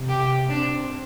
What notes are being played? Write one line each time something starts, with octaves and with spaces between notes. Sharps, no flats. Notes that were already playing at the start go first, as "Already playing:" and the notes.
Already playing: C3
G4
C4 D4